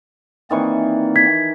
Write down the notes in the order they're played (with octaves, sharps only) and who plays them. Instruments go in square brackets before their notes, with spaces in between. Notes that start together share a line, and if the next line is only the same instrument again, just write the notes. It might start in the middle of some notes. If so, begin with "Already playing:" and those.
[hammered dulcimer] D#3 E3 C#6 [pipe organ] A#3 C4 D5
[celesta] G#6 B6